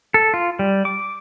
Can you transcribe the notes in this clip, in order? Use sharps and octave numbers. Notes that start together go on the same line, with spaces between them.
A4
F4
G3
D6